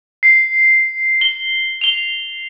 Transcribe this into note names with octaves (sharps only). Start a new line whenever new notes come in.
C7
G7
F7 G7